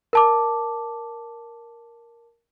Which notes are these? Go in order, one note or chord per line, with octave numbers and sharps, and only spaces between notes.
A#4 A5 D6